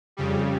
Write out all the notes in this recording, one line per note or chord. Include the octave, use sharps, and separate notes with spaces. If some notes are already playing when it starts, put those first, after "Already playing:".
F2 C#3 G3